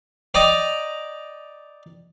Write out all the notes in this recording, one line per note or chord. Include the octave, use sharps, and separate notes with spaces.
D5 D#5 G5 A#5 D6 D#6